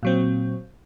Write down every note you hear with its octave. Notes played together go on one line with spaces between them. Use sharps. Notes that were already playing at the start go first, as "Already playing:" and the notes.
A#2 F#3 C4